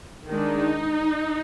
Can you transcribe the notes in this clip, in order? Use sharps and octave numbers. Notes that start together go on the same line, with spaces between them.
D#3 G#3 D4 D#4